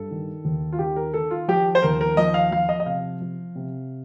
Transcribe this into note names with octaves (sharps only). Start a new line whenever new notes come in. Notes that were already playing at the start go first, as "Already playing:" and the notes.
Already playing: G2 A4
D#3
D#2
F4
D#3 G4
A#4
D#3 A4
F4
F3 G4
C5
D#2 A#4
A#4
F3 D#5
F5
F3 F5
D#5
D#5
C3 F5
F3
C3